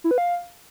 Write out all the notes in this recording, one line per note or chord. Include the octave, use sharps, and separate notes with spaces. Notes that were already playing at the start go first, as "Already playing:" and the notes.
E4
B4
F5